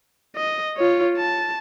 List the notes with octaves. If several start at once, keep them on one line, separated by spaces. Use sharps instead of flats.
D#5
F4 C#5
A5